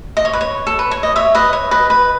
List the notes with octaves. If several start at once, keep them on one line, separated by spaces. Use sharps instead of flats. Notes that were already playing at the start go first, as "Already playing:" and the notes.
D#5
C#5
B4
C#5
A4
B4
C#5
D#5
C#5 E5
B4 D#5
C#5
B4 D#5
B4